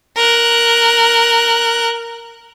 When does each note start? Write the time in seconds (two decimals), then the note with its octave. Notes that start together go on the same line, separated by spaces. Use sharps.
0.16 A#4 F#6